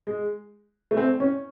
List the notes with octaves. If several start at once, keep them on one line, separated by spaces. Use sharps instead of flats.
G#3
A3
C4
C#4